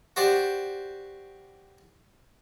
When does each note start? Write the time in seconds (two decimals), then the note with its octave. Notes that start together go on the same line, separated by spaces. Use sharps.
0.16 F#4 G4 C5 D5